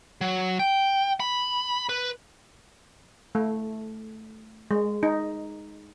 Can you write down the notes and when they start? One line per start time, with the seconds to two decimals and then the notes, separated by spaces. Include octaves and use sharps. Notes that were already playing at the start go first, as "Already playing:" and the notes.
0.21 F#3
0.59 G5
1.20 B5
1.89 B4
3.35 A3
4.71 G#3
5.03 D#4